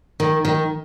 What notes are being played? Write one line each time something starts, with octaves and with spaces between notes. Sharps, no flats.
D#3
D#3